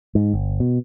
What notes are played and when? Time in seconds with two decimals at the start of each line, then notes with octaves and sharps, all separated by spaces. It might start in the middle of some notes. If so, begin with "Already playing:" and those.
0.15 G#2
0.33 G1
0.60 B2